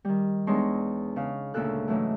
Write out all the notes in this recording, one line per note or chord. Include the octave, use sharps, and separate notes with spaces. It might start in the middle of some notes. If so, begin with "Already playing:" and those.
D#3 G3
E2 G#3 D4 D#4 C#5 C6
C#3 F5
D2 A#2 C#3 F4 A4 F#6
G#2 C#3 E3 F#3 A3